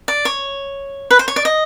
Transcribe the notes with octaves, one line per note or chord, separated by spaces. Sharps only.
D5
C#5
B4
C5
C#5
D5
D#5